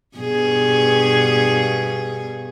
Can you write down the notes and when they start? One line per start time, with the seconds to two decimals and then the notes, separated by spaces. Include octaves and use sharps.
0.17 G2 B2 G#4